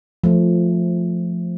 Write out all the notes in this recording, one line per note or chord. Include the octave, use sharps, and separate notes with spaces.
F3 A3